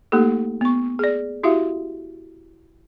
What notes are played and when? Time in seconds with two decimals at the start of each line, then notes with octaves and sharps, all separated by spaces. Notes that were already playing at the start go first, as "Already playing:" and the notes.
0.12 A3 A#3 D#4 G4 A4
0.61 B3 C#6
0.99 G#4 D5
1.43 E4 F#4 G4 E5 F5